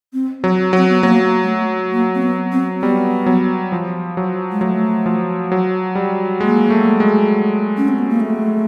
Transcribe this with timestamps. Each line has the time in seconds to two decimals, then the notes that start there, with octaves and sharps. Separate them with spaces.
0.13 C4
0.44 F#3
0.73 F#3 C4
0.90 B3
1.03 F#3 A#3
1.43 G#3
1.48 A3
1.93 A#3
2.15 C4
2.22 B3
2.52 C4
2.82 G3 B3
3.26 F#3
3.72 F3
4.17 F#3
4.51 G#3
4.61 F#3 A3
5.06 F3
5.52 F#3
5.95 G3
6.40 G#3 A#3
6.70 A3
7.00 G#3
7.77 C#4
7.88 C4
7.99 B3
8.09 A#3
8.20 A3